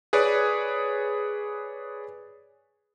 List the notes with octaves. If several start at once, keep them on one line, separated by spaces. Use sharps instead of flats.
G#4 B4 C#5 D5